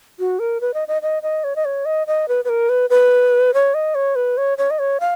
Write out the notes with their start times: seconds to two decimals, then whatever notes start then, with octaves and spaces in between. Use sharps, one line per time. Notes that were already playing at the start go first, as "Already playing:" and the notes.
0.19 F#4
0.39 A#4
0.61 B4
0.74 D#5
0.88 D#5
1.02 D#5
1.23 D#5
1.44 C#5
1.56 D#5
1.65 C#5
1.85 D#5
2.07 D#5
2.28 B4
2.45 B4
2.49 A#4
2.69 B4
2.90 B4
3.54 C#5
3.74 D#5
3.95 C#5
4.16 B4
4.37 C#5
4.58 C#5
4.71 D#5
4.79 C#5
5.00 F5